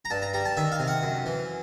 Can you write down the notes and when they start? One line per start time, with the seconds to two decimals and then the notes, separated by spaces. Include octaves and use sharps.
0.05 A#5
0.10 G2 A5
0.22 A#5
0.34 G3 A#5
0.45 A5
0.57 D#3 E5
0.72 F5
0.79 C3
0.87 F#5
1.03 F#2
1.26 E3